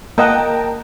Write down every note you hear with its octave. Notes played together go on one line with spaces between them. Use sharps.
A#3 A#4 D#5 F#5 G5 A5